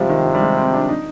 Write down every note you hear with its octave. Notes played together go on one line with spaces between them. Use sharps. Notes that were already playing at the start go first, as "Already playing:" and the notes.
Already playing: C3 F3 G3 G#3
D#3
F3
G3
G#3
C4
D4
D#4